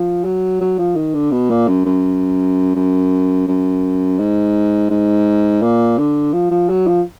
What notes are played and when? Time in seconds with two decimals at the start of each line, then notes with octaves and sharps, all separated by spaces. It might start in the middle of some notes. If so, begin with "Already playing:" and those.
Already playing: F3
0.25 F#3
0.61 F#3
0.79 F3
0.96 D#3
1.15 D3
1.32 B2
1.50 A#2
1.68 F#2
1.86 F#2
2.76 F#2
3.48 F#2
4.19 G#2
4.90 G#2
5.62 A#2
5.98 D3
6.33 F3
6.51 F3
6.69 F#3
6.87 F3